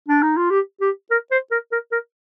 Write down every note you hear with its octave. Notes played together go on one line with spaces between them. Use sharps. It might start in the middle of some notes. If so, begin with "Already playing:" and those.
D4
D#4
F4
G4
G4
A#4
C5
A#4
A#4
A#4